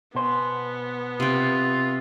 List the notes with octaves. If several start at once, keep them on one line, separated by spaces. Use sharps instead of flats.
B2 B3 C5 G#5
C3 F4 G5